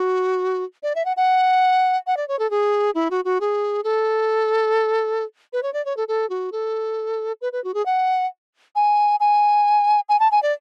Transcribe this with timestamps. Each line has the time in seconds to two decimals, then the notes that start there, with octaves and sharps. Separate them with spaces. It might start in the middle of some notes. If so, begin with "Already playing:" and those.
Already playing: F#4
0.83 D5
0.95 E5
1.05 F#5
1.17 F#5
2.07 F#5
2.17 D5
2.28 C#5
2.39 A4
2.50 G#4
2.95 E4
3.11 F#4
3.25 F#4
3.41 G#4
3.84 A4
5.53 B4
5.63 C#5
5.73 D5
5.85 C#5
5.97 A4
6.08 A4
6.30 F#4
6.52 A4
7.41 B4
7.52 B4
7.64 F#4
7.74 G#4
7.86 F#5
8.76 G#5
9.20 G#5
10.09 G#5
10.20 A5
10.32 G#5
10.43 D5